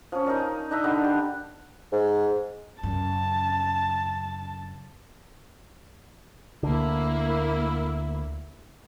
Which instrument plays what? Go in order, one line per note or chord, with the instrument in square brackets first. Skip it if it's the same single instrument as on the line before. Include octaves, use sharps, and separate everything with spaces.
[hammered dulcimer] F3 C#4
D#4 A#4 D5
D4 D#4 D#5 E5
D3 G3 D4 D#4
G4
[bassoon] G#2
[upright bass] F#2 C#3 [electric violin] A5
[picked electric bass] D2 D3 [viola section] A#3 E4